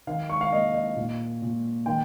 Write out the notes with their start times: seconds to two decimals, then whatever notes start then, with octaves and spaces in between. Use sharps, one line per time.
0.07 D#3 F5
0.30 C#6
0.41 F5
0.52 A#3 D#5
0.74 D#5
0.96 A#2
1.42 A#2
1.86 D#3 G5